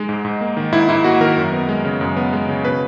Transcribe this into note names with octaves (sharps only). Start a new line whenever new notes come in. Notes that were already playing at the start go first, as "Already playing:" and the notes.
Already playing: G#3 D#4
G#2
G#2
A#3
D#3
G#2 E4
G#2 E4
A#3 F#4
D#3 A#4
F#2
B3
G#3
C#3
F#2
B3
G#3
C#3
B2 B4